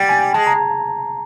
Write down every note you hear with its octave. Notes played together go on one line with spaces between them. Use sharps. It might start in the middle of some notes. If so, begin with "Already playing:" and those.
Already playing: G3 F#5 G5
G#5
G#3 A5
A#5